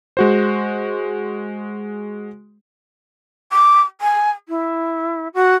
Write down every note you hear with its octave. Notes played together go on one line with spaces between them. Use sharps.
G#3 F#4 C5
D6
G#5
E4
F#4